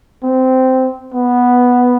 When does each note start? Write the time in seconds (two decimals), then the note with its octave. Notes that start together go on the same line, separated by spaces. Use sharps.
0.23 C4
1.14 B3